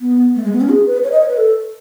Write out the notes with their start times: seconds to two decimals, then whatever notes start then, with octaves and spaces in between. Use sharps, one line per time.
0.01 B3
0.36 A3
0.44 G#3
0.52 B3
0.61 C#4
0.69 G#4
0.86 B4
1.04 C#5
1.12 D#5
1.21 C#5
1.29 B4
1.37 A4